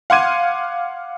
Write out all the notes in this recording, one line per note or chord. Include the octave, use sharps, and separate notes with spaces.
F5 F#5 C6 D6 G#6 D#7